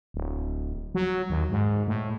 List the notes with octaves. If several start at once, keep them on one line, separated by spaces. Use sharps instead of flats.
D1
F#3
D#2
G#2
A2